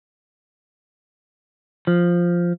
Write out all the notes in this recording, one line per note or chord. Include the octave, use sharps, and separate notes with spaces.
F3